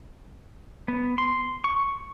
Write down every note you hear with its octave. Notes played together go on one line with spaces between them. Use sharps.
B3
C6
C#6